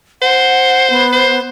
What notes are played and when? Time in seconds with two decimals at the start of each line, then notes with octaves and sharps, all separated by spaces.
0.22 C5 F#5
0.90 B3
1.12 C5